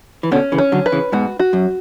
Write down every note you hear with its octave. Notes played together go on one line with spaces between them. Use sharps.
E3
B2 D3 C#4
C#3 E3
C#4
D3 F#3
B4
C#3 E3
G#2 B2 F#4
F#4
F#2